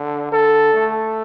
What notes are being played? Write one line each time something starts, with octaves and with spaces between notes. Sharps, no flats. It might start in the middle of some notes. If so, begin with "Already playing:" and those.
Already playing: D3
D3 A4
A3